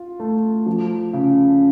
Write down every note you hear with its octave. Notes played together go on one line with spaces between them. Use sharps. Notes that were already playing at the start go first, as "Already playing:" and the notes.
Already playing: F4
A3
F3
C#3